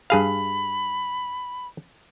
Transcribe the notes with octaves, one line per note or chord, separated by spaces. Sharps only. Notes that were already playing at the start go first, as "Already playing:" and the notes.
G2 G#4 F5 B5